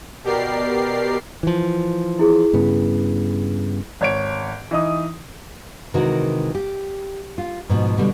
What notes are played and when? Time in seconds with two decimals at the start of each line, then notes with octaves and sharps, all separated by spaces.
0.24 B2 G4 A#4 D5 C7
1.43 E3 F3
2.19 E4 G#4
2.53 G2 C#3 B3
4.01 G#1 C#5 D7
4.71 E3 D#4 D#6
5.94 C3 D#3 E3 G#3 F#4 A#4
6.55 G4
7.38 F4
7.69 G#2 B2 F3
7.98 B2 D3 G3